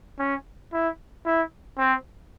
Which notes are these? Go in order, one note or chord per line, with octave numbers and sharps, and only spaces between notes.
C#4
E4
E4
C4